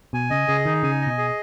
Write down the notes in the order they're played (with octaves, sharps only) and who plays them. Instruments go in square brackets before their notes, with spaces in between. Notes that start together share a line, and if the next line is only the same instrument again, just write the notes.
[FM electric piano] B2 [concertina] G#5
[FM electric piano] C#3 [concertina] D#5
[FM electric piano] C#3 [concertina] G#4
[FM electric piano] D#3 [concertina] D#4
[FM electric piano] C#3 [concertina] G#5
[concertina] D#5
[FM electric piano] B2
[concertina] G#4